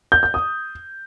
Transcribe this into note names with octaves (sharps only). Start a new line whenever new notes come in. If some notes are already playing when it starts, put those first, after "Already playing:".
G6
G6
D#6